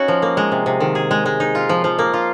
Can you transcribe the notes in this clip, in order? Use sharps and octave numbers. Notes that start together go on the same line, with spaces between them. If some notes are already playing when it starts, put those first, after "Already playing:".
Already playing: C#4 D#4 F#4
F3
A#3
G#3
C3
C3
D#3
G#4
G#3
G#3
D#4
F4
F3
F3
A#3
F4